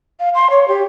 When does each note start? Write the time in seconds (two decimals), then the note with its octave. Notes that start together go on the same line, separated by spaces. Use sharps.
0.20 F5
0.35 C6
0.50 C#5
0.68 G4